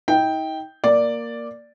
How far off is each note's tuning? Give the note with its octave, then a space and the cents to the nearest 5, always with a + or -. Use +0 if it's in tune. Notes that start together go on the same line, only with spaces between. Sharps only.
D#4 +40 G5 +0
A#3 +0 D5 +0